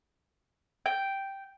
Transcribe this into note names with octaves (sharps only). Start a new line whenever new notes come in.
G5